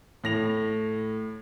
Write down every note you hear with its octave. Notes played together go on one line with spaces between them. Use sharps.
A2 A#6 F7